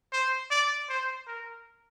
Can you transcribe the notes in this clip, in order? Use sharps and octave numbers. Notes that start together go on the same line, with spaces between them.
C5
D5
C5
A#4